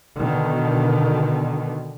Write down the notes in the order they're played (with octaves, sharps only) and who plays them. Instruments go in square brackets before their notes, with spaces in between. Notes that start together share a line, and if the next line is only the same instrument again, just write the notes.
[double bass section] B2 D3 D#3